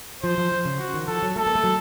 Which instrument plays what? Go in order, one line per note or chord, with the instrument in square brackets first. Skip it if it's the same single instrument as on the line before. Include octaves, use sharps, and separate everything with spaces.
[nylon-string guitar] F3 [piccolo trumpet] C5
[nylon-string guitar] F3
F3
C#3
[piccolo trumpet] F#4
[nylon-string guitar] D#3
[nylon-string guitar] F3 [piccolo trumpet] A4
[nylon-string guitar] F#3
[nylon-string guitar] A3 [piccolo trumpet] A4
[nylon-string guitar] A#3
A3
F#3